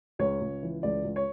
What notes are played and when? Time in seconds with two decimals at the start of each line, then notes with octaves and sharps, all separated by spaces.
0.19 C#2 C#5
0.41 C#2
0.63 E3
0.83 C#2 D5
1.05 C#2
1.16 C#5